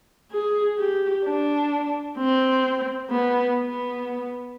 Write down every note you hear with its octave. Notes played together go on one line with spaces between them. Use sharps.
G#4
G4
D4
C4
B3
B3